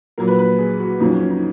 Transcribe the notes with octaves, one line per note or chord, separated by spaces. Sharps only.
A#1 A#2 F#3 A#4
B4
B4
G#4
F#4
F2 C#3 F#3 D#4
C#4
C#4
D#4